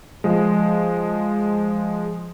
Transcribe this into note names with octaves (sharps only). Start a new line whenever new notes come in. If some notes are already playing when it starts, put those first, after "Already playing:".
F3 G#3